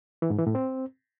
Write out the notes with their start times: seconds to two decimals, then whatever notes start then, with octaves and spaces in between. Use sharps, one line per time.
0.22 E3
0.30 G#2
0.38 E3
0.47 A2
0.55 C4